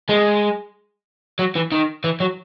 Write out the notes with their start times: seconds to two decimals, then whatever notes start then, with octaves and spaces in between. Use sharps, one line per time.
0.09 G#3
1.39 F#3
1.56 E3
1.72 D#3
2.04 E3
2.20 F#3